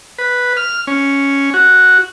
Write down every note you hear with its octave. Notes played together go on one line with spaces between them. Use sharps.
B4
F6
C#4
F#4